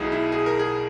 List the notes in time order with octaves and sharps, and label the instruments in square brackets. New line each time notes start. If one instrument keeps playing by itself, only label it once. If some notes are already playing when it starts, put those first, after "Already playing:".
Already playing: [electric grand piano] B1 B2 F#3 D#4 E4 G#4
E4
G#4
A#4
G#4